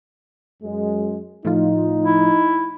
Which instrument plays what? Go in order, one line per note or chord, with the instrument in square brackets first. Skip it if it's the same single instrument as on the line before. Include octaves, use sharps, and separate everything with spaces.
[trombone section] F#2 G#3
[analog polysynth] A2 F3 F4 [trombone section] D#4
[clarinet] E4